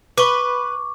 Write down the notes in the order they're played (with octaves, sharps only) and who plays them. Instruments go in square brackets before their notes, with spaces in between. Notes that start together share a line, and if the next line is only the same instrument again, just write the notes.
[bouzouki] B4 [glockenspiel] C#6 D6